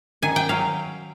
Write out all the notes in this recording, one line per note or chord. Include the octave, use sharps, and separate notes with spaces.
D#3 G#5
G5
F#3 F5